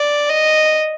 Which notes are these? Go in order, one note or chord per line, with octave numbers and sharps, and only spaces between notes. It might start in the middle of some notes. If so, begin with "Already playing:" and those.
Already playing: D5
D#5